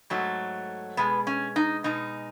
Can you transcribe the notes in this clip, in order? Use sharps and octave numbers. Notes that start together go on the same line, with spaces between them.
G#2 F#3 A3
B2 G#3 B3
C#4
D#4
B2 G#3 D#4